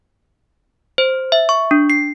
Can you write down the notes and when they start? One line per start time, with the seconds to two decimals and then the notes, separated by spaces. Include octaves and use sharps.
0.98 C5
1.32 E5
1.49 C#6
1.71 D4
1.90 C7